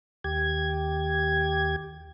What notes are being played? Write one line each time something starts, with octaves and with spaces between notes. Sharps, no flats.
D#2 G4 G#6